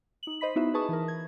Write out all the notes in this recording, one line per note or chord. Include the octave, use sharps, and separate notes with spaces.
D#4 F#7
C5 D#5 B5 B6
B3 D#4 E4 F#4 E5
G#4 B4 A5 C#6 D#6
E3 A#4
G#6